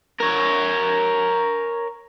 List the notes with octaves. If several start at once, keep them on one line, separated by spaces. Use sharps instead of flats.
A#4 C#5